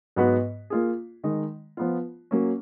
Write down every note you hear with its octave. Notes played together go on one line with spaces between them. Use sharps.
G#2 F#3 B3 F#4 B4
A#3 F4 G#4
D#3 G#3 D#4
F3 B3 F4
F#3 A#3 C#4